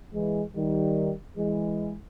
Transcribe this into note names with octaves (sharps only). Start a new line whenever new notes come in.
E3 G#3
D#3 G3
E3 G#3